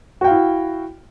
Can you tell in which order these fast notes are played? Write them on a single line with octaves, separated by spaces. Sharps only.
F#4 G5 F5 E4